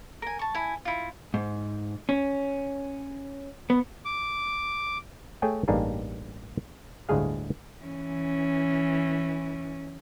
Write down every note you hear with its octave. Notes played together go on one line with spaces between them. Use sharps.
A#4 G#5
A5 C#6
E4 G#5
E4 F4
G#2
C#4
B3
D6
A3 G#4 C#5 E5 G5 G#5
A1 G2 A#3 D4 D#4 G#4
G1 D2 A2 G#3 G#4 F5
E3 C#4